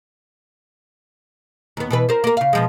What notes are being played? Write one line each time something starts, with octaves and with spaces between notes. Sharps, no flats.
D#2 B3
B2 E3 B4
A#4 C5
A#3 A#4
C#3 F5
B2 F3 G#3